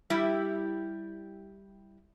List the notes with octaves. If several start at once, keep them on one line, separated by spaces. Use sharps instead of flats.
G3 E4 G4